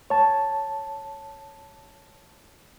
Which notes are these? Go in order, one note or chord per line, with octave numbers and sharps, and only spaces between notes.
C#5 A5